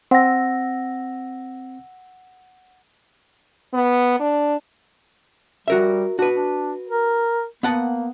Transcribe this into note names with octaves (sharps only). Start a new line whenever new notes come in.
C4 F#5 E6 A#6
B3
D4
G3 F#4 A#4 E5
D4 F#4 B4
D4
A#4
A#3 B3 F#5 A5